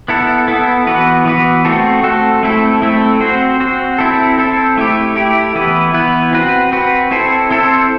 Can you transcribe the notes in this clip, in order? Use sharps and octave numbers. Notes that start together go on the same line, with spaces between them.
B3 E4 A4
B3 E4 A4
E3 B3 F#4 B4
E3 B3 F#4 B4
A3 C4 F#4 A4
A3 C4 F#4 A4
A3 C4 E4 A4
A3 C4 E4 A4
C4 F#4 C5
C4 F#4 C5
C4 E4 A4
C4 E4 A4
A3 E4 G4
A3 E4 G4
E3 B3 E4 B4
E3 B3 E4 B4
C4 F#4 B4
C4 F#4 B4
C4 E4 A4 C5
C4 E4 A4 C5